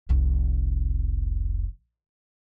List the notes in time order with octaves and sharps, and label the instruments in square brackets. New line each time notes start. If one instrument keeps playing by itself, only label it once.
[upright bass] F1 C2